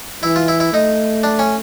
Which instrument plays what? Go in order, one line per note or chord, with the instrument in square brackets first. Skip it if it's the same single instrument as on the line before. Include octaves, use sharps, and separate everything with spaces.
[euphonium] E3 [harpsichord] E4
[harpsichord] F4
E4
E4
[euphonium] A3 [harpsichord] D#4
[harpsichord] D4
C#4